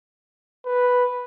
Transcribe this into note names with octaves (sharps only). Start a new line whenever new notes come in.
B4